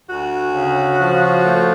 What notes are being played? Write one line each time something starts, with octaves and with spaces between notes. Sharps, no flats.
D2 F#4
C#3
F3
A3